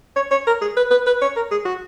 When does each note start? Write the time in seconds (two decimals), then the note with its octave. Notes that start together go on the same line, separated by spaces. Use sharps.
0.16 C#5
0.31 C#5
0.47 A#4
0.61 G#4
0.77 B4
0.91 B4
1.07 B4
1.22 C#5
1.36 A#4
1.51 G#4
1.65 F#4